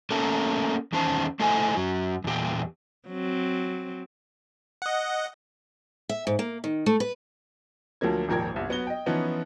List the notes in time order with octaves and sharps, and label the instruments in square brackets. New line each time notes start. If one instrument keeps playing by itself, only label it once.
[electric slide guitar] A3 A#3 C#4 A4 A#4
E2 D#3 C#4 C5 A5
A3 E4 A4 C5 D#5 G#5
F#2 F#3
E2 A#2 G4
[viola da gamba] F#3 C4
[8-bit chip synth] D#5 F#5
[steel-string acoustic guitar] E5
G#2
A#3
D#3
A3
B4
[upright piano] D2 F3 F#3 A#3 G#6
D#1 G#1 F3 A#4 G5 G#6
G1 C2
F#3 B3 F#4 G7
D#5 G5
E3 F3 B3 C#4 D#4 E4